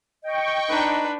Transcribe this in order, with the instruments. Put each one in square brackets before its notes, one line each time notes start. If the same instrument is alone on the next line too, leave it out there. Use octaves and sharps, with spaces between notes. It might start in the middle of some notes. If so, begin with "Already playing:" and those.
[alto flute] D#5 [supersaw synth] G5 C#6
[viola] D4 B4 [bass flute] D#4